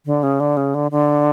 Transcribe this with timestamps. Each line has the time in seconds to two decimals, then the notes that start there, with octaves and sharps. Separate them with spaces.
0.06 D3
0.23 C#3
0.40 D3
0.57 C#3
0.75 D3
0.91 D3